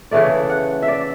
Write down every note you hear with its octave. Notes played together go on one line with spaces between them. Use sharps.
C#3 E3 A3 D5
F#5
E5
D5